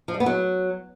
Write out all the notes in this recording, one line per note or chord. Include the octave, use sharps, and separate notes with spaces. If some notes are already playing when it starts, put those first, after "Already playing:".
F3
G3
B3
F#3